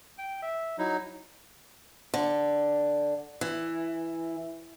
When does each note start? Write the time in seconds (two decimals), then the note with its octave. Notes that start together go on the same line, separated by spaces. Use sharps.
0.18 G5
0.42 E5
0.79 F#3 D#4 E4
2.14 D3
3.41 E3